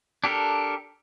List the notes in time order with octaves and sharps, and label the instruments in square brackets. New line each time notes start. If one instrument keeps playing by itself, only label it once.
[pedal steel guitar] D4 G4 A4 A#4